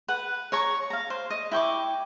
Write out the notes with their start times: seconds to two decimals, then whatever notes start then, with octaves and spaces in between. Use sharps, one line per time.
0.08 B4 F#5
0.52 C#5 A#5 C#6
0.90 F5 A#5
1.10 C5
1.30 D#5
1.52 E4 G5 C#6 D6